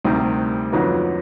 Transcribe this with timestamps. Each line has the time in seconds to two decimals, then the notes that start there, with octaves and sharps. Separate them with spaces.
0.05 D2 C3 D#3 G3 C4
0.72 F2 D3 F#3 B3 D#4